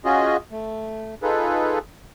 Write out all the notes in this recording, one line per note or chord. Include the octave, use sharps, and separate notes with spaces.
C#4 F4 F#4 G#4 D#5
A3
D#4 F4 G#4 A4 B4